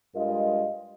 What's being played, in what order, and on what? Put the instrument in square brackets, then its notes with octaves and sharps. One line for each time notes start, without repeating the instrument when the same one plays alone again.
[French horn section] G2 G#3 F4 A#4 D#5